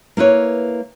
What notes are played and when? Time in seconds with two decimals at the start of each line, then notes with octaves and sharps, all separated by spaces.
0.17 A#3 E4 B4 C#5